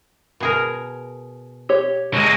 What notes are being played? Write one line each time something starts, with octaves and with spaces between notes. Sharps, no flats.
B2 G#4 A#4
G4 C#5
F#3 G#3